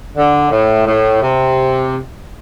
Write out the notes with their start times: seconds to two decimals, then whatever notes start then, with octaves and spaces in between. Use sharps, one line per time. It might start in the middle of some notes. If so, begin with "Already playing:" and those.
0.16 D3
0.51 A2
0.87 A2
1.22 C3